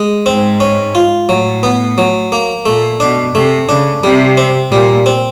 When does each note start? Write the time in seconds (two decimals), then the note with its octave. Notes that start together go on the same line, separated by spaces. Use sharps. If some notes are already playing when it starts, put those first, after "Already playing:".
Already playing: G#3
0.26 G#2 C4
0.60 C#4
0.95 F4
1.29 A2 F#3
1.63 B3
1.98 F#3
2.32 A#3
2.66 A#2 A3
3.00 B2 D4
3.34 C3 A3
3.69 C#3 D4
4.03 C3 G3
4.37 C4
4.71 A#2 G3
5.06 C4